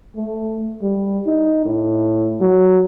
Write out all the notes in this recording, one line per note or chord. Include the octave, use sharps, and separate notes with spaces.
A3
G3
D#4
A2
F#3